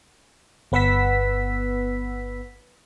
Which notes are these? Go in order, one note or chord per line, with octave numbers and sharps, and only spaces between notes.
G1 B3 B4 F#5 E6 B6